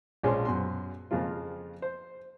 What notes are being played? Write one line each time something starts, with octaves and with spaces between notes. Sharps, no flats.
A#1 F3 G#3 C#4 C6
F#2 B2 C6
F2 C#3 G#3 A#3 F4
C5